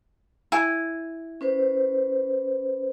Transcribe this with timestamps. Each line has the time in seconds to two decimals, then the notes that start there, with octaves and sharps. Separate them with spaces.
0.52 E4 G#5
1.41 C#4 B4 C5